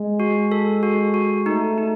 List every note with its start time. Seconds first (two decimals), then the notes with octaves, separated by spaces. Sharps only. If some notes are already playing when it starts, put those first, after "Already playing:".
Already playing: G#3
0.20 F#4
0.52 A4
0.83 F#4
1.14 F#4
1.46 A3 D#4
1.78 D#4